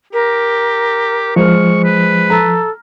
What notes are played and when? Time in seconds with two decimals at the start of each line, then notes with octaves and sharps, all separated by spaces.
0.13 G4 A#4
1.36 F3 G#3 C5 C#6 F6
1.84 B4
2.30 A4 A#5